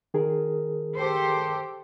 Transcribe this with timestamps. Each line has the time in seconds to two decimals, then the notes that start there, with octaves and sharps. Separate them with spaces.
0.14 D#3 G#4 A#4
0.95 G4 A4 C5